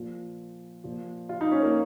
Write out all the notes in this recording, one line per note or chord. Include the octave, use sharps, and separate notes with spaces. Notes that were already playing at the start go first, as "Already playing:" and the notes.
Already playing: A#2 F3
A#2 F3
F4
D#4
C#4
A#3